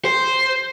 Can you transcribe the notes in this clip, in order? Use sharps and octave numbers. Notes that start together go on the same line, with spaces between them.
C5